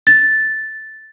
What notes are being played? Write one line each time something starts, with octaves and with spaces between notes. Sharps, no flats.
A6